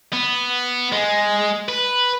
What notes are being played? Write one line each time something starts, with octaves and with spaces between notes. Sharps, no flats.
B3
G#3
B4